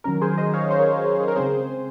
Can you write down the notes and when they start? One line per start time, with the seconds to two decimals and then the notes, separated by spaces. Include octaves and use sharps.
0.04 D#3 F#3 C#4 A#4
0.21 G#4 C5
0.38 C5 D#5
0.53 C#5 F5
0.70 C5 D#5
0.79 A#4 C#5
0.87 G#4
1.04 G#4
1.20 G#4
1.28 A#4
1.36 C#3 G#3 C4 G#4 C5